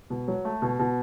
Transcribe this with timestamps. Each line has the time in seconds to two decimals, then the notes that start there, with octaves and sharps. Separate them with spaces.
0.10 B2
0.28 F#3
0.45 A3
0.62 B2
0.79 B2